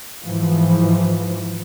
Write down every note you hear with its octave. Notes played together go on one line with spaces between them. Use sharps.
G#2 E3 F3